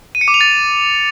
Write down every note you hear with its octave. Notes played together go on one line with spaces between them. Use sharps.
D#7
C#7
D6
F7
A6